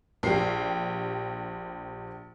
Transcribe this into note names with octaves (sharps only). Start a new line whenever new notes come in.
A#1 G4 C7